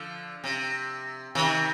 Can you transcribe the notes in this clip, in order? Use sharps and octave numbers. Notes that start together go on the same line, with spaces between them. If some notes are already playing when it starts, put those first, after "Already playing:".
Already playing: D3 F3
C3
C3 D#3